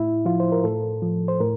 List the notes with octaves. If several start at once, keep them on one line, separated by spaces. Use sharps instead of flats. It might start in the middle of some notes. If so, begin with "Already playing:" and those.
Already playing: A2 E4
F3 F4
C5
A#4
A2 A4
F3
C5
A2 A#4